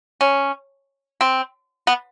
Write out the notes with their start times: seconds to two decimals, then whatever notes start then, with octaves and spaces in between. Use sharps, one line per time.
0.21 C#4
1.21 C4
1.87 B3